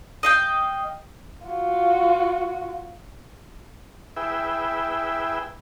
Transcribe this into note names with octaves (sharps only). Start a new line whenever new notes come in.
D#5 F5 G5
F4 F#4
E4 G#4 B4 E5 G5